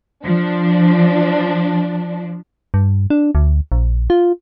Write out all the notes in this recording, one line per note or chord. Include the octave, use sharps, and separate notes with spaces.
F3 D4
G2
D4
D2
A#1
F4